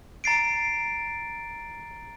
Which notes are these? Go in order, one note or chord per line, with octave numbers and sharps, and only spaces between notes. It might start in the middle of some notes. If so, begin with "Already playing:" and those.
A#5 A6 C7 D7